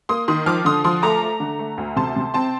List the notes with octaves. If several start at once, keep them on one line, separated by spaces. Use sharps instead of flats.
A#3 C6 D#6
D#3 C6 D#6
F3 D6 F6
D3 C6 D#6
F3 C6 D#6
A3 A#5 D6
A3
D3
A3
D2
C3 A5 C6
C3
C4 A5 C6